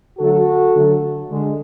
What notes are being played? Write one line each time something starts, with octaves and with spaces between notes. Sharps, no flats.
D3 F#3 A3 F#4 A4
D3 F#3 A3
D3 G#3